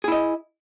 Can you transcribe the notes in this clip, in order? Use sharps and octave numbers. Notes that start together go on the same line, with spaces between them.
E4 G#4 D#5